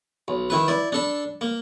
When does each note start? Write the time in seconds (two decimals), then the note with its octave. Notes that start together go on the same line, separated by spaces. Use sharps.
0.28 B1
0.50 D#3 E4 B4
0.68 E4 D5
0.92 D4 A4 B5
1.41 A#3